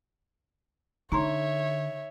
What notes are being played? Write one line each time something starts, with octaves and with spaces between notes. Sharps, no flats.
D3 D#4 C#5 E5 A#5 C6